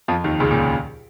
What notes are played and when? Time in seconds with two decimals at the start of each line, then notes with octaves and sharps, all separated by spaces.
0.08 F2 F3
0.24 D#2 D#3
0.40 C#2 C#3
0.51 A#2
0.61 A#2